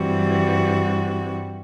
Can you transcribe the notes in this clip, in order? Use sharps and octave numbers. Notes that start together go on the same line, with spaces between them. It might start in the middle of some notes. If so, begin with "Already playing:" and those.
Already playing: G2 E3 G3 C4 F#4